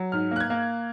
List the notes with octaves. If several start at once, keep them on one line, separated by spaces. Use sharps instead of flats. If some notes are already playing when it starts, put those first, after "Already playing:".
Already playing: F#3
G#2 F6
A#3 F#6
G#6
A#3